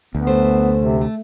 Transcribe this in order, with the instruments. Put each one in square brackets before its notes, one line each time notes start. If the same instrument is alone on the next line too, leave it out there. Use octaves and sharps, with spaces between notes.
[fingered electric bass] D2 [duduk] B3
[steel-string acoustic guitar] F#2 A3 C5
[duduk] C3
[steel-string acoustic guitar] A3